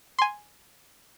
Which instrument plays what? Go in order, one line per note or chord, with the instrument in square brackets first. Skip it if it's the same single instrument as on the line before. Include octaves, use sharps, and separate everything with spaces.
[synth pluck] G#5 C6